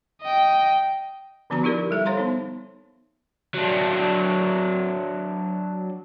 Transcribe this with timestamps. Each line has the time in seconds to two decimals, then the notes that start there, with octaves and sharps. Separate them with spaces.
0.22 D#5 G5
1.50 D3 F3 B3 D4 F#4 A#5
1.63 D#4 E4 G4 A#4 D5
1.91 G3 A4 E5
2.06 C5 C#5 F5 A#5 C6
2.17 B3 D#4
3.55 F#3 D4